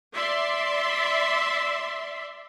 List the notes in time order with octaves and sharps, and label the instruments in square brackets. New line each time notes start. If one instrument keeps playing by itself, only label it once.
[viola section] D5 E5 C6